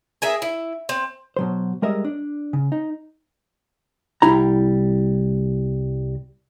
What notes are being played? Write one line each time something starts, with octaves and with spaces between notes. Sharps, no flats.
G#4 A#4 E5
E4
C4
B2 F#3 C5
G3 G#3 A#4 D#5 E5
D4
C#3
D#4
C2 G3 E4 A#5